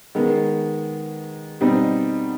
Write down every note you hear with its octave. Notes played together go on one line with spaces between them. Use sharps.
D#3 G#3 B3
B2 G3 C4 D#4